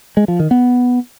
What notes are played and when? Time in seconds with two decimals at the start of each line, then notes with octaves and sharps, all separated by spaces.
0.17 G#3
0.28 F3
0.40 D#3
0.51 B3